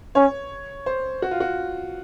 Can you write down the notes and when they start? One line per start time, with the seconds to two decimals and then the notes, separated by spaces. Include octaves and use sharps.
0.15 C#4 C#5
0.86 C5
1.22 F#4
1.31 F4
1.40 F#4